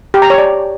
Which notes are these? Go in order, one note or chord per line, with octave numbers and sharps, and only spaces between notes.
G4
A#5
C#5
D5